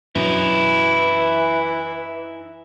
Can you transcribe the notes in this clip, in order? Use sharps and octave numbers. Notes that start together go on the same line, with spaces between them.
F#2 B2 E3 F#3 D#4 E4